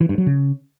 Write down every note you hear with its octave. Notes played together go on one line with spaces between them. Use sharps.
E3
G2
F#3
C#3